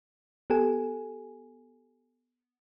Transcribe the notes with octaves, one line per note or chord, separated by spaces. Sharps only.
B3 G4 A4 G#5